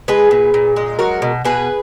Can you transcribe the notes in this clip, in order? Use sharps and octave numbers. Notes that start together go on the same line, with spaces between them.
G#3 G#4 B4
A#2
A#2
G#3
F#3 F#4 A#4
B2
B2 G#4 B4